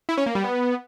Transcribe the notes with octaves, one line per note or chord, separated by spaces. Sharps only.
E4
C#4
A#3
G3
B3